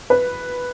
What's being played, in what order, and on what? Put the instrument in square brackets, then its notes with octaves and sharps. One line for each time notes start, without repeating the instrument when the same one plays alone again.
[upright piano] B4